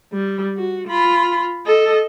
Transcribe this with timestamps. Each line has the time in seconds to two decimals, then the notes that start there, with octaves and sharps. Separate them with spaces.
0.12 G3
0.56 F#4
0.87 F4 B5
1.66 A4 D#5